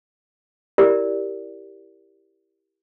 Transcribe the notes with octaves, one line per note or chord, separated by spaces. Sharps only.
E4 G4 A#4 D5